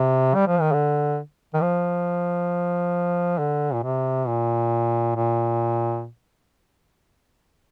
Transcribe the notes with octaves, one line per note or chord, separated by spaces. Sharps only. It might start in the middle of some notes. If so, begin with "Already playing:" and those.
Already playing: C3
G3
F3
D#3
D3
D#3
F3
D3
A#2
C3
A#2
A#2